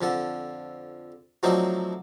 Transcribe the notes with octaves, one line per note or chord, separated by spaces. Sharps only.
F2 D3 A4
F3 F#3 A3 C4 D4 D#4